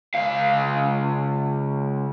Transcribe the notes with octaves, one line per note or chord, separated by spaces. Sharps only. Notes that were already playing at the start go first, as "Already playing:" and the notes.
C#2 F5